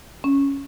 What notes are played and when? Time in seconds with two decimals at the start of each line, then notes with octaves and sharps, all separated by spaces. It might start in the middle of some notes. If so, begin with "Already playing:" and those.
0.24 C#4